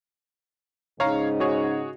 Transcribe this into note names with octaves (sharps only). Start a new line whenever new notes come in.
G#2 C#3 D#4 C#5 F5 A#5
F#4 G#4 C#5